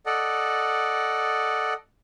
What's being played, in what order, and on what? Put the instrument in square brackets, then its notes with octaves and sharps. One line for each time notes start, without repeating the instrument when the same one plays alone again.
[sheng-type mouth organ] A4 D5 D#5 F#5